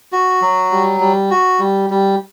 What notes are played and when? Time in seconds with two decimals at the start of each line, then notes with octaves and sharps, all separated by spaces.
0.12 F#4
0.42 F#3
0.71 G3
1.00 G3
1.31 F#4
1.59 G3
1.90 G3